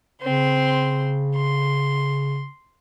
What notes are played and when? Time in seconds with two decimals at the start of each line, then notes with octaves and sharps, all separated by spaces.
0.22 C#3 C4 C6
1.36 C6